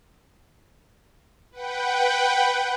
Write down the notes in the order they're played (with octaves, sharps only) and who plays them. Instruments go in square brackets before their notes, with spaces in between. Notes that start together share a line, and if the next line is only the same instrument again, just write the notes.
[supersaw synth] B4 F#5 G5